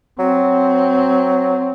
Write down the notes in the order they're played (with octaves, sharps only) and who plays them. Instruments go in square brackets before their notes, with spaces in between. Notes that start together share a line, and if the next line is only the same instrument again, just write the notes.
[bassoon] F#3 [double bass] C4